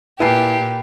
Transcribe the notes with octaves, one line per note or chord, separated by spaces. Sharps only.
A#2 E4 G4 B4 G#5 A5 C7